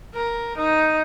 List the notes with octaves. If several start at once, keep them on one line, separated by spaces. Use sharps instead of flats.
A#4
D#4